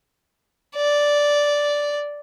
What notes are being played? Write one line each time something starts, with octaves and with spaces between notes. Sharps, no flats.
D5